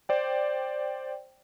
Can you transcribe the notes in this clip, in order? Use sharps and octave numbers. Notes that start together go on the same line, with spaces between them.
C5 D5 G5